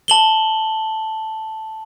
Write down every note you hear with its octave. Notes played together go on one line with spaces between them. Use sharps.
A5 F#7 G7